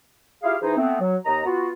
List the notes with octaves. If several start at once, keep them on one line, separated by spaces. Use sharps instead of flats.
E4 F4 G4 G#4 F5
E3 D#4 G#4 C5
A3 B3 C4
F#3
D#2 D#5 A#5
B3 F4 F#4